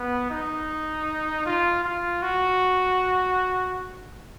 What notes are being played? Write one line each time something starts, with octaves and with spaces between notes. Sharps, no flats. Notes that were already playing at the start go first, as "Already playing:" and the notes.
Already playing: B3
D#4
F4
F4
F#4